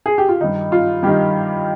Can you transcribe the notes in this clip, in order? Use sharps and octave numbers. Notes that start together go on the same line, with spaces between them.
G#4
G4
F4
G2 D#3 D#4
F4
G2 D#3 G4